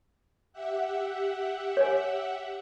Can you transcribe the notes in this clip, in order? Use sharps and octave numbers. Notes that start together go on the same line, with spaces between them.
G4 E5 F#5
C#5 G#5